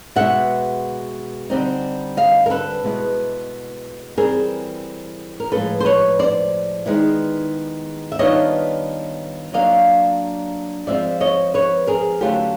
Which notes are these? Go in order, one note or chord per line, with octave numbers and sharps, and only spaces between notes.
B2 G#3 B3 E5 F#5
D3 G3 C4 D#4
D#5 F5
A#4
A4 B4
B2 G#3 B3 E4
E3 G3 C4 G#4 A#4
A#4
A2 F3 G#3 A4 B4
C5
B4 C#5
C5 D5
D#3 G#3 B3 E4
E5
D#3 G3 B3 D4 F4 C#5 D#5
F#3 A#3 D4 D#5 F5
F3 G#3 C4 F4 D5 E5
C#5 D#5
B4 C#5
G#4 A#4
D3 F#3 A3 C#4 F4 G4 A4